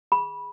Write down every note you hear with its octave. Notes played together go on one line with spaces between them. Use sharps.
G#4 B5